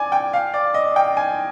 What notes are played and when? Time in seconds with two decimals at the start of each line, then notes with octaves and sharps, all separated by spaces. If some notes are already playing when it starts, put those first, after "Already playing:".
Already playing: D5 G#5
0.12 G5
0.33 F5
0.54 D5
0.74 D#5
0.96 G5
1.17 G#5